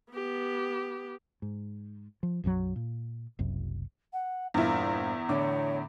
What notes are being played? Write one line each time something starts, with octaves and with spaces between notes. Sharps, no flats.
B3 G4
G#2
F3
B1 F#2 F3 F#3
A#2
F#1 C2 F#2
F#5
E2 G2 A#2 E4 F4 C5
A2 D3 C#5 D6